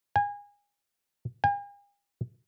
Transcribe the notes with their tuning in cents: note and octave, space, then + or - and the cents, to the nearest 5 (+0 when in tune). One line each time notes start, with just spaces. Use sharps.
G#5 -25
G#5 -45